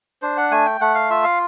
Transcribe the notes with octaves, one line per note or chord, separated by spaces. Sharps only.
D4 C5
F#5
A3 G#5
G5
A3 F#5
F5
F4 E5
F5